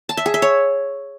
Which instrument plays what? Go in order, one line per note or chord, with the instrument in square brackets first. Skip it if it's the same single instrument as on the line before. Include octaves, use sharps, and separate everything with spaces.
[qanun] A5
E5
G#4
E5
C#5